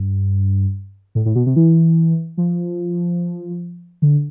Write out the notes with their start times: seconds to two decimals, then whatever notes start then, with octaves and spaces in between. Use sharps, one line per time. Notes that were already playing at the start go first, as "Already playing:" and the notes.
Already playing: G2
1.15 A2
1.26 A2
1.35 B2
1.46 C3
1.56 E3
2.38 F3
4.02 D3